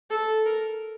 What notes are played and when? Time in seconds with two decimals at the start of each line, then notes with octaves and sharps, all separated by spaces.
0.10 A4
0.46 A#4